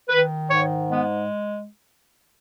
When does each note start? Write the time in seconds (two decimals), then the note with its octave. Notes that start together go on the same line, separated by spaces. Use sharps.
0.09 D#3 B4
0.49 G#2 C#5
0.90 G#3 B3